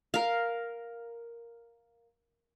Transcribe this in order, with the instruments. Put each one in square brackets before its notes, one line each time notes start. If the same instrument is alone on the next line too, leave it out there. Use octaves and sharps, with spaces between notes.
[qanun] A#4 F5